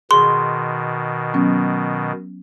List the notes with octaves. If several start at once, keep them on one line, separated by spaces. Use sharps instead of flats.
B2 D#3 G#4 C6
F#3 B3 C#4